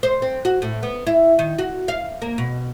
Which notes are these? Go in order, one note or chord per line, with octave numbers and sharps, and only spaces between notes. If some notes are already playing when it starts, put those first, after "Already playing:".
C5
C4
F#4
A2
B3
E4
D#3
F#4
F5
A#3
B2